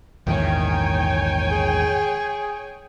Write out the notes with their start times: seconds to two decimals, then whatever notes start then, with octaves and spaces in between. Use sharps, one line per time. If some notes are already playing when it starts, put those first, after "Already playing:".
0.27 A#1 E2 G#2 D#3 C#5 G5 G#5
1.52 G#4